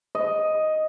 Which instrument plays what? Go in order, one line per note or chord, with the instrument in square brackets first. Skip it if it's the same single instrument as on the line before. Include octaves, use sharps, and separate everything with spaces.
[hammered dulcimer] D#5